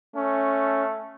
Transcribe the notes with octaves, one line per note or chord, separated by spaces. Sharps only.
A3 C#4